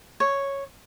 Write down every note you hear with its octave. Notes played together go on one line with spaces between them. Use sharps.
C#5